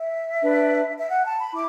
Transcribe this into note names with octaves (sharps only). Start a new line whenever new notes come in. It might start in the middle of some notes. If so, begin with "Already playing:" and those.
Already playing: E5
D4 B4
E5
F#5
A5
B5
E4 D6